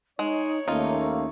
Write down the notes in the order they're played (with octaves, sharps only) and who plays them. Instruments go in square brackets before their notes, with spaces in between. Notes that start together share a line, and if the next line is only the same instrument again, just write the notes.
[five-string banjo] G#3 [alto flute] D#4 [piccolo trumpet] C#5
[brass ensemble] D#2 A3 A#3 [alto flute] C#4 [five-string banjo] D#4 F4